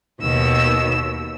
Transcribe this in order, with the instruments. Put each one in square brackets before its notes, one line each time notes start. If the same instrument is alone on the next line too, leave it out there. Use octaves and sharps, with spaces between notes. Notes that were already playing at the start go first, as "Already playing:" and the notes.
[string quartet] D#2 B2 E6